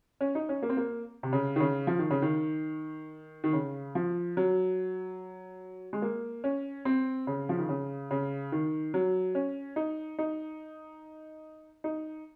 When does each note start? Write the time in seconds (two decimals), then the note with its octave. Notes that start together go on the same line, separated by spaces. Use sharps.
0.21 C#4
0.35 D#4
0.49 C#4
0.62 A#3
0.69 C4
0.77 A#3
1.23 C3
1.33 C#3
1.56 D#3
1.60 C#3
1.87 F3
1.99 D#3
2.10 C#3
2.22 D#3
3.44 D#3
3.53 C#3
3.95 F3
4.37 F#3
5.93 G#3
6.02 A#3
6.44 C#4
6.85 C4
7.27 C#3
7.49 F3
7.58 D#3
7.69 C#3
8.11 C#3
8.52 D#3
8.94 F#3
9.35 C#4
9.76 D#4
10.18 D#4
11.84 D#4